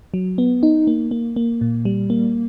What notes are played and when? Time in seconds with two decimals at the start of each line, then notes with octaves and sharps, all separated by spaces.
0.14 F#3
0.38 B3
0.63 D#4
0.87 A#3
1.11 A#3
1.36 A#3
1.61 A#2
1.85 G3
2.10 A#3